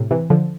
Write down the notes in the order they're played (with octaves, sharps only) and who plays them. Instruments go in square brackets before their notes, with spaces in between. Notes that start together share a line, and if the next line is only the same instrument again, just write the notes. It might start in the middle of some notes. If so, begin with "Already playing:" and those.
Already playing: [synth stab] A2 C3
C3 E3
D3 F3